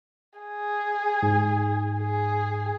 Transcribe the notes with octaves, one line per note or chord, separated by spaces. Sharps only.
G#4
G#2
G#4